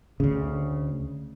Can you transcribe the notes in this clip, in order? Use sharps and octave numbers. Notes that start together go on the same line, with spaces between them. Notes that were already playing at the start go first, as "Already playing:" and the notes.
D2 C#3